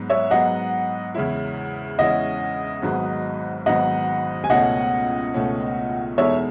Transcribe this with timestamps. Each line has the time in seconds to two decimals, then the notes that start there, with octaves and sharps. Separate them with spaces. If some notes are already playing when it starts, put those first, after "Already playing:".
Already playing: G#2 F#3 B3
0.10 C#5 E5
0.31 G#2 F#3 B3 D#5 F#5
1.15 E2 C#3 G#3 C#4 E4
1.98 E2 C#3 G#3 C#4 E4 D#5 F#5
2.82 G#1 G#2 F#3 B3 F#4
3.66 G#1 G#2 F#3 B3 F#4 D#5 F#5
4.44 G#5
4.50 C#2 B2 A3 C#4 D#5 F#5
5.34 C#2 B2 A3 C#4
6.18 E2 B2 G#3 D#4 A4 C#5 E5